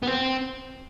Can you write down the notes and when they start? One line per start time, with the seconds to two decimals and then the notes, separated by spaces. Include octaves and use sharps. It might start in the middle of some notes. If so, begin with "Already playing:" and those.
0.02 B3
0.07 C4